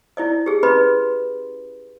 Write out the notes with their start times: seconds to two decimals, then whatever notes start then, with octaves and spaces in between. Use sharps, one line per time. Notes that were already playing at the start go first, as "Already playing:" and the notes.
0.17 E4 D5 D#5
0.46 G4 G#4
0.63 C#4 B4 D#5 B5 C6